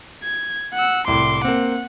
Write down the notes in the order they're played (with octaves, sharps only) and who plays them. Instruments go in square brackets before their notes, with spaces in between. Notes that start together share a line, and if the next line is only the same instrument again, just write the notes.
[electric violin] G#6
F#5 E6
[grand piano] C2 A2 [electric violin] C6 D6
[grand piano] A#3 C4 [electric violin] F#5